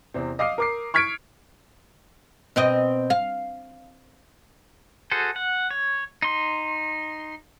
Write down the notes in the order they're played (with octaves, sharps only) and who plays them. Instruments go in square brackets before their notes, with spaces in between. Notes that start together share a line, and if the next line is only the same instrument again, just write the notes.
[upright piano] E2 C3 C4
D#5 F5 D6 D#6 C7
A#4 D6 C7
C#6 F6 G#6 B6 C#7 D7
[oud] B2 C4 D#5
F5
[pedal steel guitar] F#4 G#4 A4 C5
F#5
C#5
D#4 C6